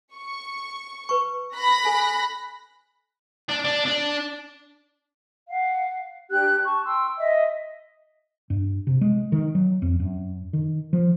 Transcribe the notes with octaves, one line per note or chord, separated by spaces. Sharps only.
C#6
B4 C#6
B5 F#6 A#6
A4 G#5
D4
D4
D4
F5 F#5
D4 G4 F#6
A5 C#6
G5 C6 E6
D#5 E5
G2
C3
G#3
D#3
F#3
F2
F#2
D#3
F3